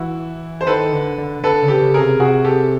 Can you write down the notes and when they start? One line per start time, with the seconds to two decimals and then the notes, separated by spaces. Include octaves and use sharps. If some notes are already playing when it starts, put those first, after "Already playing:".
Already playing: E3 E4 F#4
0.61 C5
0.67 D#3 A4 B4
0.93 D3
1.18 D3
1.43 D3 A4 B4
1.62 C#3
1.68 G4 A4
1.82 C#3
1.94 G#4 A#4
2.01 C3
2.20 C3 F#4 G#4
2.45 G4 A4